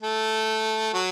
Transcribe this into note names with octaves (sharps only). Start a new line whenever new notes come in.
A3 A4
F#3 F#4